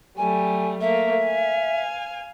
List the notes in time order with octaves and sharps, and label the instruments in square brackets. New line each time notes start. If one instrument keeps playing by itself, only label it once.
[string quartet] F#3 G3 A3 [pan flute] G#5
[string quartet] A3 A#3 [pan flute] E5
[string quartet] F5 G#5